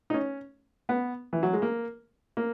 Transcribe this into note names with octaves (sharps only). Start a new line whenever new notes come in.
D#4
C#4
B3
E3
F#3
G#3
A#3
A#3